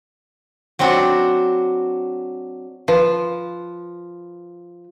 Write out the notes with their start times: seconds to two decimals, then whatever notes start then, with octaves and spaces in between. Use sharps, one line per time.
0.79 F#3 C4 D4 F#4
2.88 F3 B4